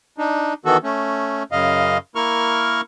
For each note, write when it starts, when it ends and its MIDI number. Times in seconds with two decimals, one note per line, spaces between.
0.18 0.53 62
0.18 0.53 63
0.65 0.77 51
0.65 0.77 52
0.65 0.77 59
0.65 0.77 66
0.65 0.77 69
0.83 1.43 57
0.83 1.43 61
1.52 1.98 42
1.52 1.98 49
1.52 1.98 75
1.52 1.98 77
2.16 2.81 58
2.16 2.81 64
2.16 2.81 70
2.16 2.81 85
2.16 2.81 89